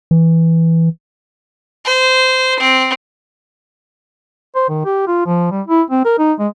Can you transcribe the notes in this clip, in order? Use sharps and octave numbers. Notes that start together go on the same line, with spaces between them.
E3
C5
C4
C5
D#3
G4
F4
F3
G3
E4
C4
A#4
D#4
G#3